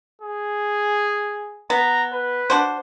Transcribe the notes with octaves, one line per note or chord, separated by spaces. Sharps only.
G#4
B3 A#5
B4
D4 F#4 C5